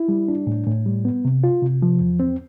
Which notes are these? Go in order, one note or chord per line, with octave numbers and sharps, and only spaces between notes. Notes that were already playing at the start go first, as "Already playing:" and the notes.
Already playing: E4
G3
D4
A2
A2
G3
B3
C3
F4
C3
F3
E2
C4